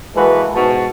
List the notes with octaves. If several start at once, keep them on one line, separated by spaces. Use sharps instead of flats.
E3 G#3 A#3 F#4 A4 B4
G#2 B2 A5